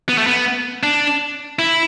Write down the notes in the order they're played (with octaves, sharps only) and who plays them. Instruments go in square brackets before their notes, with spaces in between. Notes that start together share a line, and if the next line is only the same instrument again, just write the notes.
[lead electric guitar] B3
A3
B3
D4
E4